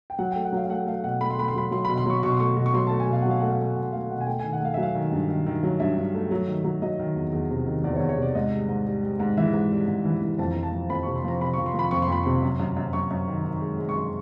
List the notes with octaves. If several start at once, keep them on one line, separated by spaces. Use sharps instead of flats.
G5
F#3 F#5
A3 G5
F#5
F#3 F5
F5
A3 F#5
A3 F5
B2 F#5
A3 B5
C6
A3 B5
C6
F#3 B5
F#3 C6
B2 B5
C6
F#3 C#6
B2 C#6
C6
A3 C#6
B2
C#6
F#3 C6
A3 A5
G#5
B2 F5
F#3 F#5
F5
A3 F#5
F5
A3
B2 F#5
A3 F5
B2 F#5
G#5
A3 G5
D#3 G#5
F#5
A3 F5
F#3 E5
F5
D#3
G2
D#3
D#3
F#3
G2 E5
G2
A3
F#3
D#3
F#3
F#3 D#5
D#3
E2
E2
C3
D#3
E2 D5
C5
C#5
E2
C#5
C3 D5
G#2 D#5
G3
G#2
G3
G3
G#2
E3 E5
G#2
G3
G#2
E3
E3
F2 A5
A#5
F3
A5
F3
F2 B5
C3 C#6
C6
F3 A#5
C3 B5
F3 C#6
C6
F3 B5
F2 C#6
C6
F2 B5
C3 C6
F#2
F#2
F#2
F#2 C#6
F#2
D#3
D#3
G#3
G#3
C#6
F#2 C6